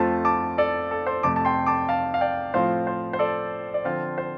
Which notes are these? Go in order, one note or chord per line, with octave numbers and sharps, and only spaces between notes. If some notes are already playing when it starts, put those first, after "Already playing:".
Already playing: F2 F3 A3 C4 F4 A5
A5 D6
A4 D5
A4
C5
F2 C3 A3 A5 D6
A5
G5 C6
A5 D6
F5 A5
F5
D5 G5
A2 F3 C4 F4 C5 F5
C5
C5
A4 D5
D5
D3 F3 C4 F4 C5 F5
C5